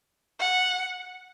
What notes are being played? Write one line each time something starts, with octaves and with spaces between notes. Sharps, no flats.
F#5